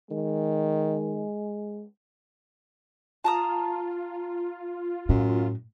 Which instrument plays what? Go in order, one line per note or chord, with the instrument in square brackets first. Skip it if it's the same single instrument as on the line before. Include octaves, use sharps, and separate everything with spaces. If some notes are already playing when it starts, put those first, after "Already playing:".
[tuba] D#3 [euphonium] G#3
[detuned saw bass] F4 [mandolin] A5 A#5 D#6
[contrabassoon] F#2 [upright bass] A2